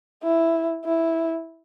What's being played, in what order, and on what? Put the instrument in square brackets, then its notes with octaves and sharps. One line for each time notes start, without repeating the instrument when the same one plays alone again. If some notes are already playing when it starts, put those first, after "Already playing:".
[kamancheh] E4
E4